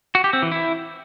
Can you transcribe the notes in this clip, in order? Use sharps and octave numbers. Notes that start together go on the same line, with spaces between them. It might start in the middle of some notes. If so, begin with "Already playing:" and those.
F#4
G4
C4
E3
E4